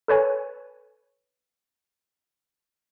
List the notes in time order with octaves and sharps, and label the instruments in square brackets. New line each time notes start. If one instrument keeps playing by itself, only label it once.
[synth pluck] A4 B4 C#5 G#5